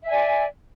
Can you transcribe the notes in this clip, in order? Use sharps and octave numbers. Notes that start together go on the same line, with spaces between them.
D5 E5 G#5